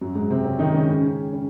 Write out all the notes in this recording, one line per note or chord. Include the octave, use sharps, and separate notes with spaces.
F#2 F#3
G#2 G#3
C3 C4
C#3 C#4
D#3 D#4
C#3 C#4
C#3 C#4
C#3 C#4